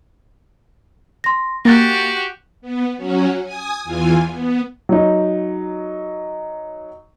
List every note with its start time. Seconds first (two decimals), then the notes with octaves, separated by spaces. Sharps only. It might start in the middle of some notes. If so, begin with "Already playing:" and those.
1.24 C6 A#6
1.65 A#3 F#4 G4 F#6 A6 A#6
2.61 B3
2.97 F#3 C#4 F#4
3.44 G#5 D#6
3.84 E2 E3 F4 G#5
4.28 B3
4.89 F#3 D#4